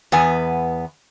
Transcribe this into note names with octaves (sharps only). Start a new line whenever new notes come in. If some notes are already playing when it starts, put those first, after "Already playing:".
E2 B3 G#5